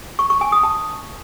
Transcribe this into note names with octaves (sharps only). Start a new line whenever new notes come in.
C#6
C#6
G#5
D#6
A5